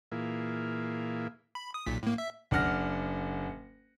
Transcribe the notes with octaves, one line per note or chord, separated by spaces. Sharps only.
A#2 E3 A#3 E4 F4 G#4
B5
D#6
B1 A#2 B6
A2 A#3
E5
F#1 D4 F#5 F6 A#6